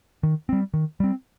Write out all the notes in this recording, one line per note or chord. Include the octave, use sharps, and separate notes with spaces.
D#3
G3 C4
D#3
G3 C4